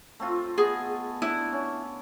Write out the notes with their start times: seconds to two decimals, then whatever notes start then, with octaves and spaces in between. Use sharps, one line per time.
0.20 A3 C4 F4
0.58 B3 G#4 D#5
1.22 D4 E4
1.52 C#4